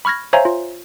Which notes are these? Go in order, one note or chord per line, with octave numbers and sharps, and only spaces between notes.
B5 C#6 F6 G#6 A#6
C5 C#5 E5 F5 G#5 A#5
F4